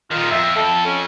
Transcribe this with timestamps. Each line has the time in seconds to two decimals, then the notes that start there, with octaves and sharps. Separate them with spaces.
0.11 A#2 D#3 F4
0.31 F2 E5
0.56 A4
0.86 C#4